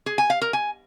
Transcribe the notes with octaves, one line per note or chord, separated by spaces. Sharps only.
G#4
G#5
F5
A#4
G#5